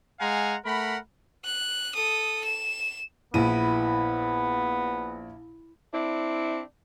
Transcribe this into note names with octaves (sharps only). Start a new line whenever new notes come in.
G#3 F5 F#5 G#5 A#5 C6
A3 A#4 F#5 B5
F#6
A4 D#6
E7
A#1 B3 E4 D#7
C4 D4 E4